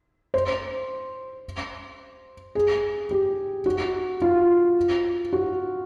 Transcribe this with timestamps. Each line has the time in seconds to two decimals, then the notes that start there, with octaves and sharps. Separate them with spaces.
0.34 C5
2.55 G#4
3.11 G4
3.66 F#4
4.22 F4
5.33 F#4